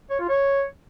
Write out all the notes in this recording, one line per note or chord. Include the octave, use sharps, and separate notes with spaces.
C#5
F4
C#5